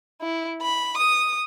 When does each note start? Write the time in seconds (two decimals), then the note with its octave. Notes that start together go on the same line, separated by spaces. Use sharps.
0.22 E4
0.63 B5
0.98 D#6